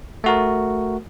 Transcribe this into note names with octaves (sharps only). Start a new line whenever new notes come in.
A3 F#4 A#4